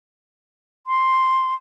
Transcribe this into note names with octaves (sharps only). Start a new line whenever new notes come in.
C6